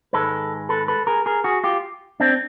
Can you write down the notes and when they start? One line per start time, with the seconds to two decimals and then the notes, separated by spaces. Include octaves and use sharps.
0.13 G#2 D#3 G#3 A4 B4
0.69 A4 B4
0.88 A4 B4
1.07 G#4 A#4
1.26 G#4 A#4
1.44 F#4 G#4
1.64 F4 G4
2.20 C4 D4